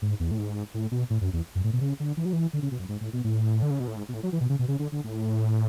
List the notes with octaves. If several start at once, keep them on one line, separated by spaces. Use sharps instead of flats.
G#2
E2
A2
G#2
A2
B2
A2
F#2
E2
F#2
A2
B2
C#3
D3
E3
F#3
E3
D3
C#3
B2
F#2
G#2
A2
B2
A2
D3
C#3
B2
A2
G#2
B2
A2
F#3
E3
B2
C#3
B2
C#3
D3
D3
A2